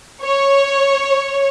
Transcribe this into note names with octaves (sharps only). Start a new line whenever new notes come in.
C#5